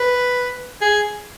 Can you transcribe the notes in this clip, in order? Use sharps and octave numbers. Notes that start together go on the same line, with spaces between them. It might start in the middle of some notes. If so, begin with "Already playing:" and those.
Already playing: B4
G#4